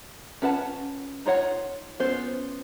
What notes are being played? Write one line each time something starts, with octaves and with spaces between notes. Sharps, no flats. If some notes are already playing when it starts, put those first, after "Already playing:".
C#4 F4 B4 F#5 A5
D#4 F4 C#5 F#5
B3 C#4 F4 C5